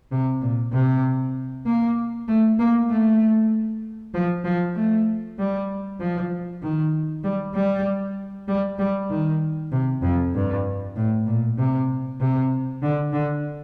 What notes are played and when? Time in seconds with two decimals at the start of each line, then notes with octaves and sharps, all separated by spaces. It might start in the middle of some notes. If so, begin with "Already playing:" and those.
0.12 C3
0.42 A#2
0.73 C3
1.66 A#3
2.28 A3
2.59 A#3
2.90 A3
4.14 F3
4.45 F3
4.75 A3
5.39 G3
6.00 F3
6.62 D#3
7.24 G3
7.55 G3
8.48 G3
8.79 G3
9.10 D#3
9.72 C3
10.02 F2
10.35 G2
10.96 A2
11.26 A#2
11.58 C3
12.20 C3
12.82 D3
13.13 D3